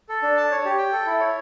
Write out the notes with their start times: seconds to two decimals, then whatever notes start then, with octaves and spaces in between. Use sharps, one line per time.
0.09 A4
0.22 D4
0.37 A5
0.51 C#5
0.65 G4
0.78 G5
0.92 A4
1.06 E4
1.20 C#5